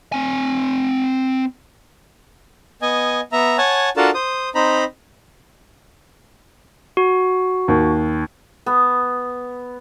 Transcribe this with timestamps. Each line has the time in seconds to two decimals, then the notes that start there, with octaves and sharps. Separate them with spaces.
0.12 C4 G#5
2.82 B3 D#5 G#5
3.32 B3 E5 A#5
3.58 C#5 F#5 G#5 A5
3.97 D4 F4 F#4 A4 A#4 A5
4.14 C5 D#6
4.55 C4 D#4 C5 A#5 B5
6.97 F#4
7.68 D#2
8.66 B3